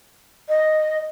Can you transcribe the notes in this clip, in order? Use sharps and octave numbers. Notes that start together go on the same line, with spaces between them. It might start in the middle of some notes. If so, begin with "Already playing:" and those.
D#5